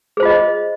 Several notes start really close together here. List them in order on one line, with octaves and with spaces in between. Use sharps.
G#4 C5 F4 D#5